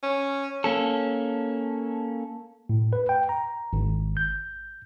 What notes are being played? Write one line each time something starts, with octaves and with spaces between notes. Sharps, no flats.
C#4
A#3 C#4 A4
A2
B4
G5
A#5
G#1
G6